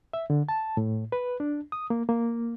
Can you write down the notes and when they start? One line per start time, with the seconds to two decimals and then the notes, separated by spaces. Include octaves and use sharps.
0.13 E5
0.30 D3
0.49 A5
0.77 A2
1.12 B4
1.40 D4
1.72 D#6
1.90 A#3
2.09 A#3